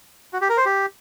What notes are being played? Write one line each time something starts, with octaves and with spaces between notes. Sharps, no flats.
F#4
G4
A#4
C5
G4